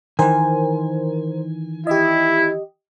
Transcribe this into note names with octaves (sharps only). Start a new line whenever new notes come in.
D#3 E3 A#4 C5 G#5
E4 G4 D#5